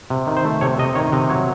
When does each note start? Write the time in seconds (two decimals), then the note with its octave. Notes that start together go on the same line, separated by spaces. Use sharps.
0.10 C3
0.27 D#3
0.37 C5
0.45 A3
0.61 C3 C#5
0.78 C3 D#5
0.95 D#3 C#5
1.12 C3 D#5
1.29 F#3 C#5